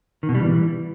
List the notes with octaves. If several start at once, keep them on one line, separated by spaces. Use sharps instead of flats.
D#3
B2
G3
E3